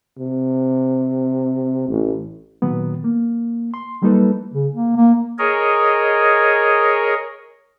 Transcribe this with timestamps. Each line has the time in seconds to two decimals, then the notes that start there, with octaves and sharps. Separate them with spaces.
0.19 C3
1.88 A1
2.62 A#2 D#3 F#3 B3
3.04 A#3
3.74 C6
4.02 F#3 G3 A#3 D#4 A4 B4
4.54 C#3
4.74 A#3
4.96 A#3
5.39 G#4 A#4 C#5 D#5